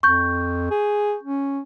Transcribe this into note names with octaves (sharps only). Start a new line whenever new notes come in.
F2 C#6 G6
G#4
C#4